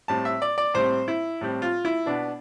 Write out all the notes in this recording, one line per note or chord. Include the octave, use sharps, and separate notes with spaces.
A2 G3 C4 A5
E5
D5
D5
A2 G3 C4 C5
E4
A2 G3 C4
F4
E4
B2 B3 D4